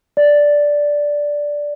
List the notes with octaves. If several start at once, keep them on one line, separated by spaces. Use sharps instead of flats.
D5